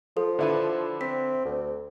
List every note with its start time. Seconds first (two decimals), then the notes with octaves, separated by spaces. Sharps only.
0.17 F3 A4
0.39 D3 E4 B4
1.01 C4 B6
1.45 D2